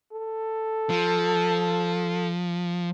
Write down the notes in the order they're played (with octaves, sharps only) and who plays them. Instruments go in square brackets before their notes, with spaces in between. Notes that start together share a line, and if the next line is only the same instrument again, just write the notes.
[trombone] A4
[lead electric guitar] F3